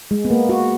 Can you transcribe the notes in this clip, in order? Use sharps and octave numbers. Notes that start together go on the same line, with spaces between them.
G#3
B3
A#3
F#4